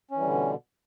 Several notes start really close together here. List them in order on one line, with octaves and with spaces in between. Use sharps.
C#4 E3 G3 D3 B2